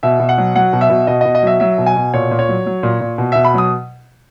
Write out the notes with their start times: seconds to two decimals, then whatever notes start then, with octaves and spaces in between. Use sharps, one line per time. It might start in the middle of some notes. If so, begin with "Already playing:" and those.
0.03 B2 E5
0.19 B2
0.29 F#5
0.38 F#3
0.56 F#3 F#5
0.73 B2
0.81 E5
0.90 B2
1.07 B2 D#5
1.21 B2 D#5
1.35 D#5
1.43 F#3 E5
1.60 F#3 E5
1.78 B2
1.86 G#5
1.96 B2
2.14 A#2 C#5
2.31 A#2
2.39 C#5
2.49 F#3
2.66 F#3
2.83 A#2
3.01 A#2
3.18 B2
3.32 B2 E5
3.45 B5
3.54 F#3 D#6